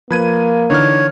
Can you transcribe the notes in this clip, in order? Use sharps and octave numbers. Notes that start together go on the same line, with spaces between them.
F3 A#3 B4 G#6 D#7
D3 E3 D#4 C#5 F6